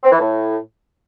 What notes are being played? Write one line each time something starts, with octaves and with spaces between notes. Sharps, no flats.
C4
E3
A2